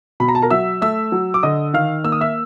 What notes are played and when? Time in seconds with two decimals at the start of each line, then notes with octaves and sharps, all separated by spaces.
0.20 B2 B5
0.28 A#5
0.35 A5
0.42 A#4 A#5
0.51 F#3 E5 E6
0.82 A3 E5 E6
1.12 F#3
1.34 D6
1.43 D3 D#5 D#6
1.74 D#3 F5 F6
2.04 A#3 E6
2.12 D#6
2.21 E5 E6